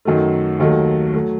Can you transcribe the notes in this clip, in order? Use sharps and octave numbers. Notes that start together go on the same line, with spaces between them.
F#2 D#3 F#3 A3
D#2 D#3 F#3 A3
F#3 A3